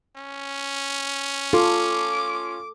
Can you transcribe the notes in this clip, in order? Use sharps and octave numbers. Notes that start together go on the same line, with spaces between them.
C#4
F4 A4 D6